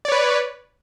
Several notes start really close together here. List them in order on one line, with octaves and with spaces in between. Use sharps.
D5 C#5 B4